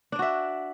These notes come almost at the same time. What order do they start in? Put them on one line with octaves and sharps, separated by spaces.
D4 D5 F#4 E5